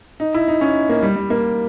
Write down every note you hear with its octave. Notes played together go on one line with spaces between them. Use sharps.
D#4
E4
D#4
C#4
A#3
G3
G3
A#3